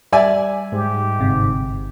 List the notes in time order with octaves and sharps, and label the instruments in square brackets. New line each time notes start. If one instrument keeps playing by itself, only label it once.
[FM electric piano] G3 [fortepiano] D5 E5 G#5
[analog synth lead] G#2 [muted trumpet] G4
[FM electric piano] G1 C3